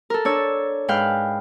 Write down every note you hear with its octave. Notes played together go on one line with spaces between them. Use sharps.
A4 A#4
D4 C#5 E6
G#2 B4 F5 G5 F6